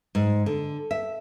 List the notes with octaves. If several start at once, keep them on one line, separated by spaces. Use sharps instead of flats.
G#2
D3
E5